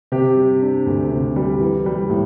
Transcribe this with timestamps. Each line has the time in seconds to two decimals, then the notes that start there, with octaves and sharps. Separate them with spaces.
0.12 C3 G4
0.36 G3
0.62 D4
0.86 D2
1.11 C3
1.36 G3
1.60 E3
1.86 G3
2.10 A2